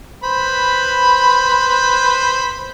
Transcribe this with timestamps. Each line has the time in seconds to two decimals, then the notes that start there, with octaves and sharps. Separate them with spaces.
0.24 B4 C5 B5